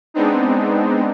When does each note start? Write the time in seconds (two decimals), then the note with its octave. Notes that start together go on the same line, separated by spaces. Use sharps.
0.14 G#3 B3 C4 D4 D#4